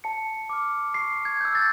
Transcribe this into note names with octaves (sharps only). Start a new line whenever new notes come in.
A5 C#7
D6 F6
C#6 C7
G#6
E6 G6
A6